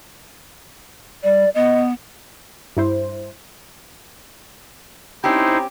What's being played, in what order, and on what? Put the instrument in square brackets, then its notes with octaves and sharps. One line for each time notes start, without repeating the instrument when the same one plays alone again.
[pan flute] G3 [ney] D5
[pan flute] B3 [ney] D#5
[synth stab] G2 E4 C5
[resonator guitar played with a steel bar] C4 C#4 G4 [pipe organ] D#4 E4 C5